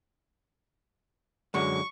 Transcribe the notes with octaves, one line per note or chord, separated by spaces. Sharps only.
F#2 D3 F#3 G#3 C#6